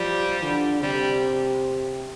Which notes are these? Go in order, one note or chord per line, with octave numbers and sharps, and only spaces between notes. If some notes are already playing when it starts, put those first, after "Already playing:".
Already playing: F3 G3
D3
C3 G3